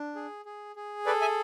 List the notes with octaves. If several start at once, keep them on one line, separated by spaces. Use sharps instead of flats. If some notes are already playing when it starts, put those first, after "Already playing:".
Already playing: D4
G#4
G#4
G#4
A4 B4 D5
E5 G#5